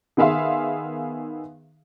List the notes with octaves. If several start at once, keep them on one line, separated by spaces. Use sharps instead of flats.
D#3 B3 G#4 E5 F5 C6